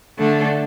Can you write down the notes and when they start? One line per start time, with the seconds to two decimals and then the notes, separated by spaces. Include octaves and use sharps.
0.18 D3 A3 D4 A4